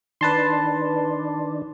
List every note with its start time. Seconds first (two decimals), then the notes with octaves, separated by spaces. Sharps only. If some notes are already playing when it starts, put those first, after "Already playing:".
0.21 D#3 D4 B4 A5 C6